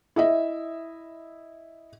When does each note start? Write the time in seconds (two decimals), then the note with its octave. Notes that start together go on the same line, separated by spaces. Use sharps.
0.16 E4 D#5 E5